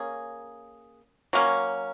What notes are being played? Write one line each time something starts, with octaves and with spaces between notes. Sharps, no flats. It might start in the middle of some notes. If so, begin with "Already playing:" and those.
Already playing: A#3 C#4 G#4
F#3 A#3 C#4